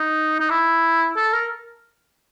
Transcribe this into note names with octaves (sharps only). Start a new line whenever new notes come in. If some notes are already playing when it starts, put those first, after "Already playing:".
Already playing: D#4
D#4
E4
A4
A#4